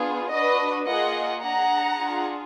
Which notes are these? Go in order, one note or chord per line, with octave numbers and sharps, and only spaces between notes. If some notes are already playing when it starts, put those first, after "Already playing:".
Already playing: B3 D4 F4 G#4
D4 F#4 B4 D#5
A#3 F4 G#4 D#5 F#5
D4 G#4 F#5 A#5
D4 F4 G#4